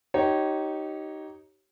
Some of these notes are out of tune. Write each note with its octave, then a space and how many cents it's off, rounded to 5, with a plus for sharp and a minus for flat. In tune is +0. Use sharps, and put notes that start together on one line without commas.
D#4 +0 G4 -30 C#5 -15